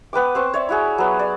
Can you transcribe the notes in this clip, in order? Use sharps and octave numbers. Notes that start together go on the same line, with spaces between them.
B3 B4 G5 D6
C4 C5 C#6
C#5 D5 E5
E4 F#4 G#4
F#3 B3
D5